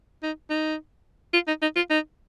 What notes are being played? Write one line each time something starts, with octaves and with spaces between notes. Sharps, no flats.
D#4
D#4
F4
D#4
D#4
F4
D#4